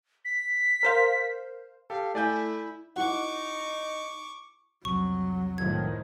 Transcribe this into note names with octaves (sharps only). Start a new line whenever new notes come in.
B6
A#4 C5 F5
G4 A4 F5
A3 E4 D5 G#5 G6
D#4 E4 F#4 F#5 C#6 D6
C2 F2 F#3 C#6
A2 D#3 F3 G#6